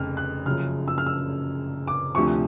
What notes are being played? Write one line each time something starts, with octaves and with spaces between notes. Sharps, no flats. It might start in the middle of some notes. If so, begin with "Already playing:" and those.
Already playing: F1 F2 C#3 F6
F#6
F#1 F#2 C#3 F3 F6
E6
F6
E6
D6
D2 C3 F3 C#6